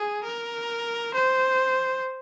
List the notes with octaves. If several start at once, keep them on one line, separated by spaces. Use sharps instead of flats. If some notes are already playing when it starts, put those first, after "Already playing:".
Already playing: G#4
A#4
C5